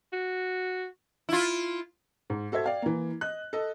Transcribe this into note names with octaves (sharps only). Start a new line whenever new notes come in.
F#4
E4 F4
G#2
F#4 A4 C5 E5 G#6
D5 F5 G5
E3 A#3
D#5 F#6
A4 D#5